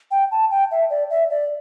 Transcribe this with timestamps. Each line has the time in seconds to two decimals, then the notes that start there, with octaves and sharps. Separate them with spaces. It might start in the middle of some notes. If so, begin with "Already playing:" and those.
0.11 G5
0.31 A5
0.51 G5
0.71 E5
0.90 D5
1.10 E5
1.30 D5